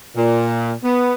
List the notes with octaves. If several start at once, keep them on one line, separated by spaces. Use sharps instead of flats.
A#2
B3